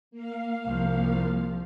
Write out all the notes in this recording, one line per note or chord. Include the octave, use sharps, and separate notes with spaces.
A#3 F5
C2 F3